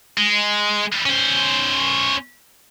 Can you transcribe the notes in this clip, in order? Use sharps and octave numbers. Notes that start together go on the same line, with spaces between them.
G#3
C#4 C5